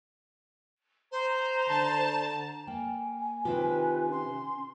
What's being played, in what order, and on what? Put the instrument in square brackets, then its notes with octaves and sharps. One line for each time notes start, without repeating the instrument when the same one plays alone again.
[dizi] C5 [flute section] A#5
[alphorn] D3 [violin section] A5
[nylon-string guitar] A#3 [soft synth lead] G5 [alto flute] G#5
[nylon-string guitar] C3 D#3 G4 [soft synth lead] F4 [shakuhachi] B4
[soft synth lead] C#4 [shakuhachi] C6